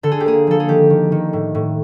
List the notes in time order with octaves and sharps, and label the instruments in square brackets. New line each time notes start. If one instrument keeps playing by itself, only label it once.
[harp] D3 A4
G#4
G4
A#3 G#4
F3 A4
G#4
D#3 G4
D#3
D#3
A2
A2